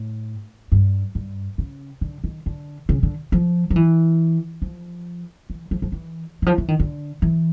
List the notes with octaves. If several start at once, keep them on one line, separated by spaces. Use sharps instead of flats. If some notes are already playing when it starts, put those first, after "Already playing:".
Already playing: A2
G2
G2
C#3
D3
D#3
D3
C#3
D3
F3
F3
E3
F3
E3
F3
F3
E3
E3
F3
E3
D#3
D3
E3